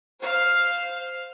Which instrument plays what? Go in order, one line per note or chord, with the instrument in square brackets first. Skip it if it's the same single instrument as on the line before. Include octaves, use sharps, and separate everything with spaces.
[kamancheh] C5 F5